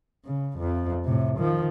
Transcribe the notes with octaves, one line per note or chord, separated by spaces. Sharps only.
C#3
F2
A2 C3
D#3 F3